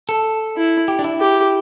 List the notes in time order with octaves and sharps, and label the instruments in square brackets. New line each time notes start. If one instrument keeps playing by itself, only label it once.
[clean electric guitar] A4
[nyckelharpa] E4
[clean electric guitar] G4
D4
E4
[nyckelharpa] G4